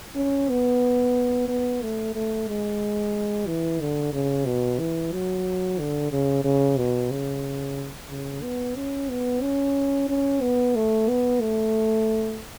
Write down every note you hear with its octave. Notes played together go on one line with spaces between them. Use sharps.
C#4
B3
B3
A3
A3
G#3
E3
D3
C#3
B2
E3
F#3
D3
C#3
C#3
B2
C#3
C#3
B3
C#4
B3
C#4
C#4
B3
A3
B3
A3